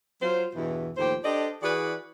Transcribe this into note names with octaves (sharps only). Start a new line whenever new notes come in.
F#3 F4 C5
E2 G2 B2 E3
D#2 A2 F3 G4 C5
D4 G4 A4 C5 D5 D#5
E3 F#4 G#4 B4 D5